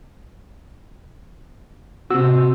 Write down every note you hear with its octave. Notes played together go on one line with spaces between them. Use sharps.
C3 F#4 E6